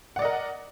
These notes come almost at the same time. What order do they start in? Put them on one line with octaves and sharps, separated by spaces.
F#5 D5 D#5 A#4